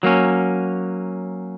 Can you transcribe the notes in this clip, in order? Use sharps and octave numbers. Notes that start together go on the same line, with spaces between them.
F#3 A#3 C#4